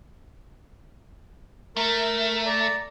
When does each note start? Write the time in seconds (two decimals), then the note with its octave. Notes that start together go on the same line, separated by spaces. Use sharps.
1.77 A3 A#4
2.46 D5 A#5